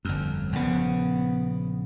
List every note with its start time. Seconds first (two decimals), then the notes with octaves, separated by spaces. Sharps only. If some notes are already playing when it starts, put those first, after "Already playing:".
0.05 G1 F2
0.53 A#1 C#3 B3